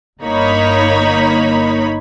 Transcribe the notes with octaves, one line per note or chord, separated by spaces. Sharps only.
G1 A#3 D#4 C#5 B5